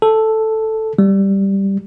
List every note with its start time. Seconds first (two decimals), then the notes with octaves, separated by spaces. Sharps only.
0.02 A4
0.99 G3